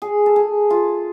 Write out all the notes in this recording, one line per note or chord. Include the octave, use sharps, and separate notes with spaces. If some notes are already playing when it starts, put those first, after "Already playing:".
G#4
A4
G#4
F4